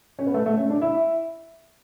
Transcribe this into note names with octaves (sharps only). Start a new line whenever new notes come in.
C#4
B3
A3
A3
C#4
D4
E4